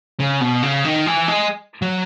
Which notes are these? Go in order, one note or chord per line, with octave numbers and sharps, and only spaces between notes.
C#3
B2
C#3
D#3
E3
G#3
F#3